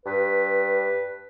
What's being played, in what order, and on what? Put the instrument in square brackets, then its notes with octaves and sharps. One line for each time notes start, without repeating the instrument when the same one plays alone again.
[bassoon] G2 [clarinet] B4